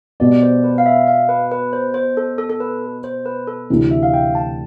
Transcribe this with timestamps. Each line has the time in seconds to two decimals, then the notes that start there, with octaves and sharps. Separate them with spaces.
0.20 B2 G3 B3 D5
0.33 D5
0.42 C5
0.64 B4
0.78 F5
0.86 E5
1.07 F5
1.29 B4
1.52 B4
1.73 C5
1.94 C5
2.17 A4
2.38 A4
2.50 A4
2.60 B4
3.04 C5
3.26 B4
3.47 A4
3.70 D2 C3 E3
3.91 E5
4.03 F5
4.14 G5
4.35 A5